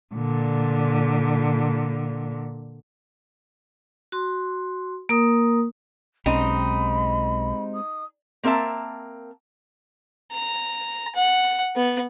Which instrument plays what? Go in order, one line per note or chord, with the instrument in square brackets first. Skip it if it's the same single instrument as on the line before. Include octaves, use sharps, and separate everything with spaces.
[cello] A#2 D3
[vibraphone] F#4 C6
A#3 A#4 D#6
[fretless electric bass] B1 C#4 [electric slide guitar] G#3 C4 G4 [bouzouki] D#4 [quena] B5
[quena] D#6
[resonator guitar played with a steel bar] A#3 C4 A#4 E5 A5
[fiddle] A#5
F#5
B3